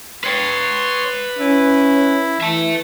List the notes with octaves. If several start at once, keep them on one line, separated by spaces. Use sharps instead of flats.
B4 C#5 G5 C6
C#4 E4
E3 E5 A5